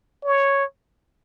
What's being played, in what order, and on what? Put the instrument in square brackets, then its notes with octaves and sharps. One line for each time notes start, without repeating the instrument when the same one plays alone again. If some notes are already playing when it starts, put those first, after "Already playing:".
[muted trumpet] C#5